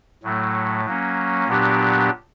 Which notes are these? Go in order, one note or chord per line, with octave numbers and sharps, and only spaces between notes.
A2 F#3 A3
F#3 A#3 C#4
A#2 F#3 B3 D4 G4